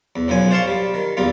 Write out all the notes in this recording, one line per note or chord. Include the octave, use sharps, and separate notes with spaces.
E2
B1 F#2 F3 G#5
C5 D5 F5 A5 C6 C#6
G3
D#3
A#1 E2 G3 F4